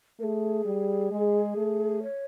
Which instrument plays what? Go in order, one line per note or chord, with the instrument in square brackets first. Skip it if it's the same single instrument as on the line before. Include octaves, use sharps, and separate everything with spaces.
[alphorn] A3 [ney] G#4 A#4
[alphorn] G3
G#3
A3
[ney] C#5